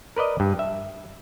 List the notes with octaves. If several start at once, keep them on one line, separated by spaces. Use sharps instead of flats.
A#4 B4 D5 D#5
G2
E5